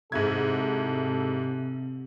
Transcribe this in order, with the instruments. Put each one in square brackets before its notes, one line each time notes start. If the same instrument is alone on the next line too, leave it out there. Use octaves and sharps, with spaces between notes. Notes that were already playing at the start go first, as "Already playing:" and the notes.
[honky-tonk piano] G#2 E4 G#6 [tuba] C3 [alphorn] A4